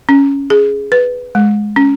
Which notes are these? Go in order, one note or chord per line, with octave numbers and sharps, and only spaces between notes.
C#4
G#4
B4
G#3
C#4